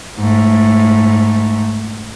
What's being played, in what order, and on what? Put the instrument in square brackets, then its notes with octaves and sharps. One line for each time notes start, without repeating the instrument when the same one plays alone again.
[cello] G#2 A3